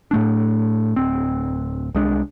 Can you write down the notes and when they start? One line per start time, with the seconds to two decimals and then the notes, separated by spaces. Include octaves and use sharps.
0.11 A2 A3 D4
0.96 D1 C4
1.95 C2 G#3 D4